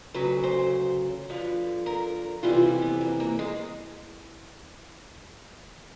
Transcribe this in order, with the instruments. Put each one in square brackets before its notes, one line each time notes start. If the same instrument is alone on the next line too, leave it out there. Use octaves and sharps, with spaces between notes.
[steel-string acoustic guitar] D2 C#3 F#3 B4
C5
G2 D3 F3 B4
A#4
F2 C3 E3 G3 F4
E4
B3
A#3
A#3
G#3